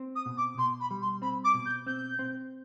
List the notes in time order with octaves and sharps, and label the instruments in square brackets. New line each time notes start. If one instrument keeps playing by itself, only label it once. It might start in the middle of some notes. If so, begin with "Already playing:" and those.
Already playing: [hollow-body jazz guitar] C4
[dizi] D#6
[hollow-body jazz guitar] B2
[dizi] D6
[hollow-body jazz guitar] B2 [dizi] C6
[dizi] B5
[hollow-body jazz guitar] G3
[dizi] C6
[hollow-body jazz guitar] C4 [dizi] B5
[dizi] D6
[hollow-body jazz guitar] B2
[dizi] G6
[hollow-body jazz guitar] C4 [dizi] G6
[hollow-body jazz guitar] C4